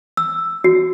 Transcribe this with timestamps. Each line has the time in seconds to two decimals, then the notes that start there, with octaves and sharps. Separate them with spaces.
0.17 E6
0.64 F#4